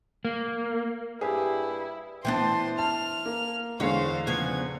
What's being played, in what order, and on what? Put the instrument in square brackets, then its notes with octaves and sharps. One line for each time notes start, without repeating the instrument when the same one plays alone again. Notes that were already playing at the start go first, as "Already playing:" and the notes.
[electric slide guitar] A#3
[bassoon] G2 [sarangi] E4 [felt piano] G4 G#4
[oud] E3 B3 D4 [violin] C5 C6 [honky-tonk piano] G5 A6
[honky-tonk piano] A5 [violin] F6
[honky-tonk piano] A#3
[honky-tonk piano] E2 D3 G#3 [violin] C5 F5 [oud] C#5
[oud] C#3 F3 B3 [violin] G#6